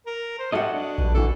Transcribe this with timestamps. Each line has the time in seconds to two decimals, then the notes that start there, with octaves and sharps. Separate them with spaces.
0.06 A#4
0.39 C5
0.52 G3 F#4 A4 D#5 E5 F#5
0.72 D4
0.98 A#1 G2
1.14 D3 E3 F#4 A4